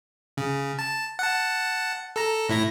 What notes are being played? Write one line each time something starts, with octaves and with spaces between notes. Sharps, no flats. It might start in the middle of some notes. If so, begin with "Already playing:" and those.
C#3
A5
F#5 A5
A4 A#5
A2 E4 A#6